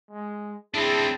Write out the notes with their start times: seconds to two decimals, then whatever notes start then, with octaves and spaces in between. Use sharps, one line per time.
0.11 G#3
0.75 C4 D4 E4 G#4 A5